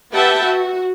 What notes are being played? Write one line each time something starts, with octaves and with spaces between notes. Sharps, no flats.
G4 B4 E5 F#5 G5 A5
F#4